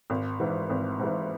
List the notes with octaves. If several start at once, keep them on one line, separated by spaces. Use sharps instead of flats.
G#1
G#2 E3
G#1
G#2 E3